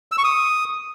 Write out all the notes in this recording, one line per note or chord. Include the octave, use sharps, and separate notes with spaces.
E6
C#6
D#6